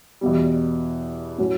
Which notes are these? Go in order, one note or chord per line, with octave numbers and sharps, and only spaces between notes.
E2 B2 G3
A2 F#3 C#4 F#4